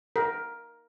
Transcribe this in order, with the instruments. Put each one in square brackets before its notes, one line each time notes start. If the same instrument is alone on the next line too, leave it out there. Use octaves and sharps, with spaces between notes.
[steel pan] A#4